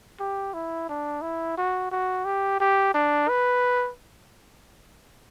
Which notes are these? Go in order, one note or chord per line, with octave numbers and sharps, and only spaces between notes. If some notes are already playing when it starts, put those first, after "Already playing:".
G4
E4
D4
E4
F#4
F#4
G4
G4
D4
B4